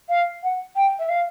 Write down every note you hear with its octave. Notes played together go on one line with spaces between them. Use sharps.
F5
F#5
G5
E5
F5